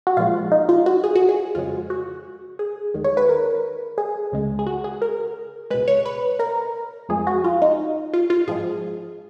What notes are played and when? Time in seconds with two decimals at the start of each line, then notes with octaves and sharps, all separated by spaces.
0.07 F#4
0.17 A#2 F3 G#3 F4
0.52 D#4
0.69 F4
0.86 F#4
1.04 G#4
1.15 F#4
1.29 G#4
1.55 F2 C#3 G#3 F4
1.90 F#4
2.59 G#4
2.94 D#2 D#3 G#3
3.04 C#5
3.17 B4
3.29 A#4
3.98 G#4
4.32 C#2 C#3 G#3
4.59 G#4
4.66 F#4
4.84 G#4
5.02 A#4
5.70 C#2 B2 G#3 B4
5.88 C#5
6.05 B4
6.39 A#4
7.09 F2 F3 G#3 G#4
7.27 F#4
7.44 F4
7.62 D#4
8.13 F4
8.30 F4
8.47 G#2 F3 G#3 G#4